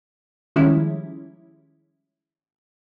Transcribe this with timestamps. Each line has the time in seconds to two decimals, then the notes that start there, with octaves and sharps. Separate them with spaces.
0.56 D#3 F3 G3 G#3 C#4 E4